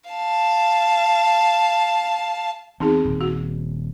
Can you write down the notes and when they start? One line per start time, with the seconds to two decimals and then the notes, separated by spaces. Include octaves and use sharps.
0.10 F5 A5
2.80 E3 B3 C4 D#4 G#4
3.05 D#1
3.21 F#4